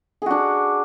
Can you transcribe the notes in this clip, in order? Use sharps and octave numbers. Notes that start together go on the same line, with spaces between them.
D4 F#4 G#4